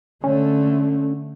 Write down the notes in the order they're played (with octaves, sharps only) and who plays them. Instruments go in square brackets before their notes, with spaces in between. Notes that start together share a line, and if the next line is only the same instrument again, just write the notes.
[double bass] D3 A3 [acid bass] C#4